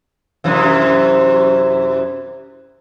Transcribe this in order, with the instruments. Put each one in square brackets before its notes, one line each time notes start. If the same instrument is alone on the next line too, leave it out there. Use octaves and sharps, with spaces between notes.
[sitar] F#2 C3 E3